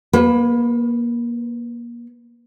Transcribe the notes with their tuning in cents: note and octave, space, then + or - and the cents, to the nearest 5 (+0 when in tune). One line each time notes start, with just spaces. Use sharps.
A#3 +25 B4 +0